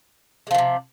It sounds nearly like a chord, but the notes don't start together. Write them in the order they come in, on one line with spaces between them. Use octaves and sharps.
G#3 F3 D#3 C3